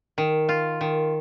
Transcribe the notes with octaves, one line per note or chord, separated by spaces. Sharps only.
D#3
F4
D#3